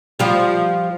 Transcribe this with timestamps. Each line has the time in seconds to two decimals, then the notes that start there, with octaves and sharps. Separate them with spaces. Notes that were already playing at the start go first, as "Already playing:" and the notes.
0.19 F3 G3